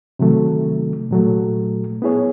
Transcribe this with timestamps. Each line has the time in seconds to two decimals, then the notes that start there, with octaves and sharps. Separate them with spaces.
0.19 C3 D#3 F#3 A3
1.11 A#2 F#3 A3
2.02 B3 E4 G#4 C#5